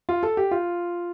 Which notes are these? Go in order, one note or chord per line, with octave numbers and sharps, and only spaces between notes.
F4
A4
G4
F4